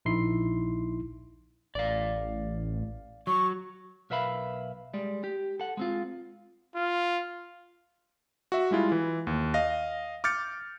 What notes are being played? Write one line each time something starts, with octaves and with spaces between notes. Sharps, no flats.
A#1 D#4 E4 C6 C7
A1 D5 F5
F#3 C#6
B1 A#4 B4 E5 F5 B5
G3 G#3 D5
G4
A4 F#5
G#3 C4 F4
F4
F#4 E5
G3 G#3 E4 F4
E3
D#2
D#5 F5 A#6
D6 F6 G6 A6 C#7